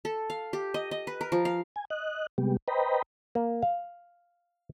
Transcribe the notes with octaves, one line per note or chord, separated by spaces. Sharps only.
A4
F5
G4
D#5
D#5
B4
A#4
F3
F5
G#5
D#5 F#6
C3 G3 G#3 B3 G4
B4 C5 D#5 G5 A#5 B5
A#3
F5